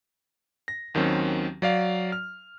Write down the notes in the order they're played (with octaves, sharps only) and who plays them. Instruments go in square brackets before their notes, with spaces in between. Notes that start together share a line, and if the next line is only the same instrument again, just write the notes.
[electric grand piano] A#6
D#2 D#3 F#3 C4 C#4
F#3 D5 F5
F6